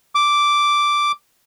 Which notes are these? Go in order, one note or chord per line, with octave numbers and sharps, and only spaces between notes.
D6